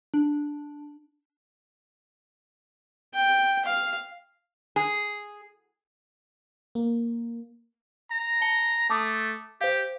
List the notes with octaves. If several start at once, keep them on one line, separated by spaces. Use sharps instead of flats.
D4
G5
F5
G#4
A#3
A#5
A5 C#7 G7
A3 A5 D6 D#6
G4 C5 F5